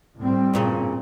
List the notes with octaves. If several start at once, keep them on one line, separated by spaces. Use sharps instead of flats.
A2 G3 C4
G2 A#2 C#3